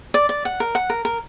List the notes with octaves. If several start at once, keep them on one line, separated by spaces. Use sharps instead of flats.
D5
D5
F#5
A#4
F#5
A#4
A#4